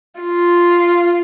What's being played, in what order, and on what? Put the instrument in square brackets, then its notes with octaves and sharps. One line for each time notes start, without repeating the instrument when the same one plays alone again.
[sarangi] F4